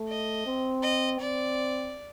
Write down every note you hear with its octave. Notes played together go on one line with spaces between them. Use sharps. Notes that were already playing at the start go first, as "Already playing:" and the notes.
Already playing: A3
D#5
C4
D#5
C4 D5